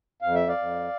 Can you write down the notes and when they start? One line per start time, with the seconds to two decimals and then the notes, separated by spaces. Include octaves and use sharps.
0.22 F2 F5
0.35 E5
0.48 D5 F5
0.57 F2